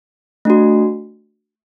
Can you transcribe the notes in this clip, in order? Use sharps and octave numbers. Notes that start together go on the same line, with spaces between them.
A3 D4 F#4